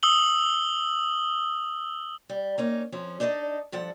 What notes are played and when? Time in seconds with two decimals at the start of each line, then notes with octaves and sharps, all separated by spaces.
0.03 D#6 E6 F#7 G7
2.29 G3
2.58 A#3 C#4 D#4
2.92 F2 F3 C#4
3.20 D4 D#4 A4 C#5 D#5
3.72 G2 F3 A4 F#5